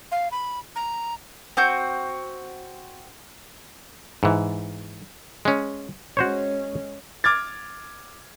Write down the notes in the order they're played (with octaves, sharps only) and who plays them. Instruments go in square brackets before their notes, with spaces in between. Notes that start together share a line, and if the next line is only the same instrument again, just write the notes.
[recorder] F5
B5
A#5
[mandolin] C4 F#4 G6
[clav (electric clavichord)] G#2 E3
G#3 C#4
[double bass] G#3 C#4 [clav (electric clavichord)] F#4 C5 C#5
[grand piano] D6 F6 G#6 A6